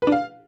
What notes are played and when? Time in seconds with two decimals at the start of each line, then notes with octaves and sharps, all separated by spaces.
0.02 B4
0.07 D4
0.12 F5